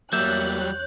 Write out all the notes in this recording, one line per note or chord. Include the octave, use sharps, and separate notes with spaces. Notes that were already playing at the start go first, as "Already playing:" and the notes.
E2 F#3 G3 A#3 C#5 E5 F#6 G6